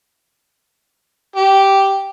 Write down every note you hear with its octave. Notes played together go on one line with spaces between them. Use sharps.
G4